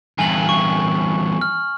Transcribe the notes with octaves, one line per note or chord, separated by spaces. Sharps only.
E2 G2 G#5 F#7
C#6
F6